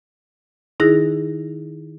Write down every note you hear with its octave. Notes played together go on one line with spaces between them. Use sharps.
D#3 D#4 E4 G#4 F#6 A#6